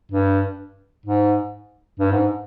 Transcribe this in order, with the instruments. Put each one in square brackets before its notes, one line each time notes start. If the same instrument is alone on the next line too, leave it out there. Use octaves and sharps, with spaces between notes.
[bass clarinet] G2
G#2
G2
G#2